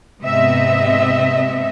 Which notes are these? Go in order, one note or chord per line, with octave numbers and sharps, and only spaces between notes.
G#2 C3 B3 C4 D#5 E5